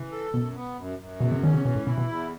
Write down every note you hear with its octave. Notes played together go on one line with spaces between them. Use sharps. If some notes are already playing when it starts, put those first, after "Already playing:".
Already playing: C#3 E3
A4
F#2 B2
B3
F#2
F#2
E2 B2
C#3
D#3 C#4
C#3
B2 E3
A2
B2 E4
B2
E2